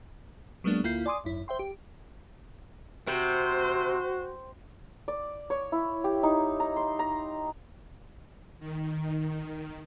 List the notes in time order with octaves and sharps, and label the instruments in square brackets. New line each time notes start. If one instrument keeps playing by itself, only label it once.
[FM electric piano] F#3 G#3 A#3 B3 D4
D2 A#3 E4 F4 G6 C7
D5 G#5 C6 D6 D#6
G#1 F#2 E4
C5 E5 G5 C6
G4
[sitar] C3 [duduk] F#4 [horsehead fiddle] C5
[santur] D5
C#5
E4
G4
D#4
A#5
C6
A#5
[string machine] D#3